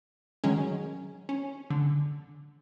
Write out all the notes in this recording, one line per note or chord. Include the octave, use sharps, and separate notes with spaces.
D#3 F#3 G#3 C#4
C#4
D3